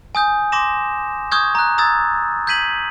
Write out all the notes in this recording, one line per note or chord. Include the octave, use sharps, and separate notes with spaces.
G#5 D#6 G6
C6 D6 A#6 E7
C#6 D#6 F6 G6 G#6
A#5 F#6
A#5 D#6 E6 G#6 A6
G6 G#6 B6 D#7 F#7